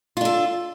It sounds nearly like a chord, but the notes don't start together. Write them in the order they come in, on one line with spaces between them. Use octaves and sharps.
F4 D4 A4